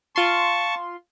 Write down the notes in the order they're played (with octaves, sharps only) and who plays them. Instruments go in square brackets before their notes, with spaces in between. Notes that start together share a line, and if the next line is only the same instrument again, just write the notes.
[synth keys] F4 C6 [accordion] A5 C#6